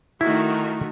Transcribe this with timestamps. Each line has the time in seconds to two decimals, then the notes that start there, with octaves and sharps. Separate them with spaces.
0.21 D#3 A3 E4 F#4